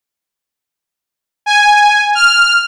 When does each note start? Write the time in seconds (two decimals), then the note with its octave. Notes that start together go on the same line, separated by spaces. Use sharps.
1.46 G#5
2.15 F6